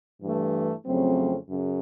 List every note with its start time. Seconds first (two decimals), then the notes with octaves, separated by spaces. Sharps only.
0.22 G2 E3 A3
0.86 F2 C#3 F#3 A3 C4
1.49 F#2 C#3